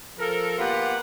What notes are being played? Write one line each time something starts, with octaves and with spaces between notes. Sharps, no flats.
F3 A4 A#4
A#3 B3 F4 G4 B4 F#5